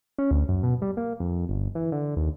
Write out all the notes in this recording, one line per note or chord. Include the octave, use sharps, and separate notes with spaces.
C#4
D2
F#2
B2
G3
A#3
F2
G1
E3
D3
D#2